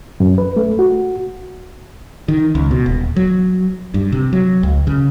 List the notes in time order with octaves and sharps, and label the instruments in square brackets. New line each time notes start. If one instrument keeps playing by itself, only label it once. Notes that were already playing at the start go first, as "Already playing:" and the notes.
[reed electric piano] F#2
B4
A3
F#4
[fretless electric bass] D#3
C#2
B2
D#1
F#3
G2
C3
F#3
C#2
C#3